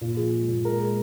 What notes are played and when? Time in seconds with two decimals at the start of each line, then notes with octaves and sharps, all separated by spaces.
0.01 A#2 F4
0.17 F3 G#4
0.33 G#3
0.48 A#2
0.65 G#3 A#4
0.80 G#3